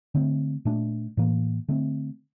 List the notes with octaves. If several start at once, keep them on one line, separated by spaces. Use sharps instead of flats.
D3 A3 C4
A#2 A3 D4
A2 E3 A#3
D3 A3 C4